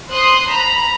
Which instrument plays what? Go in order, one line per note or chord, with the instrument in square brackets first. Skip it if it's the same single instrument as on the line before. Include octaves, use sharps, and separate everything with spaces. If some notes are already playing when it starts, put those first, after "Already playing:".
[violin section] C5 C6 D#6 F#6
A#5 B5